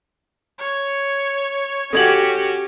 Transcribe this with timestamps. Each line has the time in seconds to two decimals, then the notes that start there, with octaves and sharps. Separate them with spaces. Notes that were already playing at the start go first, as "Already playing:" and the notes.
0.58 C#5
1.93 C#4 F#4 G4 A4 G#6 F#7